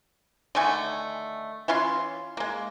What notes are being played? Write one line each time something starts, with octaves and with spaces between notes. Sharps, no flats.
D3 D#3 A3 G#5
E3 C#4 F4 C6
G#3 A#3